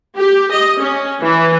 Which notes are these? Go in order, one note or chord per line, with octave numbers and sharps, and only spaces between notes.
G4
D#5
C#4
E3